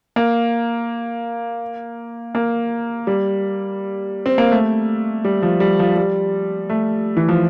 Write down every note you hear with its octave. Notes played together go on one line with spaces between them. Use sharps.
A#3
A#3
G3
C4
A#3
A3
G3
F3
G3
F3
G3
A3
E3
F3